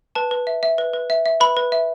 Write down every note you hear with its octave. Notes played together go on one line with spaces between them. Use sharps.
B4 A5
B4
E5
E5
B4
B4
E5
E5
B4 B5
B4
E5